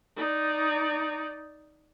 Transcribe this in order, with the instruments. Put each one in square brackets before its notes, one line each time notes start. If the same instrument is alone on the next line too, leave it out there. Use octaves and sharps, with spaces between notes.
[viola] D#4 D5